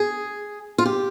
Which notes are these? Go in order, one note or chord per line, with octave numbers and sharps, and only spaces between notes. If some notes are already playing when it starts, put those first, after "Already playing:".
Already playing: G#4
F4
G4